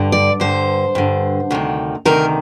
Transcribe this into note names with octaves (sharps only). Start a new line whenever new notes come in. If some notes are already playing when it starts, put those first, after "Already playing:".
Already playing: G2 D3
D5
G2 D3 C5
G2 D3
D2 C3 D#3
D2 C3 D#3 A#4